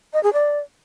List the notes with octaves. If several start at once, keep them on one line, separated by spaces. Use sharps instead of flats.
D#5
G#4
D5